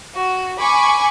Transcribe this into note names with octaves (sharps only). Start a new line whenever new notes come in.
F#4
G#5 B5 C#6 D6